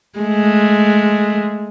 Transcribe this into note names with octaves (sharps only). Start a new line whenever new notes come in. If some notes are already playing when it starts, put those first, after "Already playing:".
G#3 A3